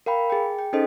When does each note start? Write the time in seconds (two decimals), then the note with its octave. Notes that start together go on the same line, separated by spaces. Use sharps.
0.06 A#4 F5 G5 B5
0.30 G#4 G5
0.59 G5
0.73 C#4 D#4 G#4 A4 C5 D#5